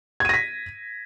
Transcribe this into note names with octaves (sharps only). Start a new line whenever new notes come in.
G#6 A#6 B6 D#7